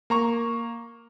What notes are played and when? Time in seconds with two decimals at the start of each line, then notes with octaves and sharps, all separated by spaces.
0.10 A#3 A#5 C#6